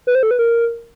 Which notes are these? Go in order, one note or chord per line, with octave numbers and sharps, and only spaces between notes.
B4
C5
A4
B4
A#4